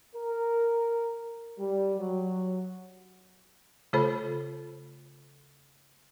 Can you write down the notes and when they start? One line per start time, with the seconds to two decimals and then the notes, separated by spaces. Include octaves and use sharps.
0.15 A#4
1.59 G3
1.98 F#3
3.93 C#3 A3 F4 A4 C5 B5